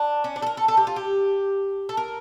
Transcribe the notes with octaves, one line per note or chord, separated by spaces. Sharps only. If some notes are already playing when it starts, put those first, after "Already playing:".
Already playing: D4
C#4
D4
A4
A#4
A4
A4
G4
F4
G4
A4
A#4